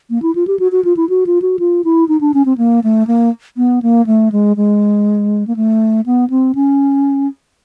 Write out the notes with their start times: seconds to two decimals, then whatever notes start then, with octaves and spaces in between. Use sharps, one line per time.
0.10 A#3
0.22 E4
0.35 F4
0.47 G4
0.59 F#4
0.72 F#4
0.84 F4
0.97 E4
1.09 F#4
1.26 F4
1.42 F#4
1.59 F4
1.84 E4
2.08 D#4
2.21 D4
2.34 C#4
2.45 C4
2.58 A#3
2.84 A3
3.07 A#3
3.57 B3
3.82 A#3
4.06 A3
4.32 G#3
4.57 G#3
5.47 A#3
5.56 A3
6.06 B3
6.30 C4
6.55 C#4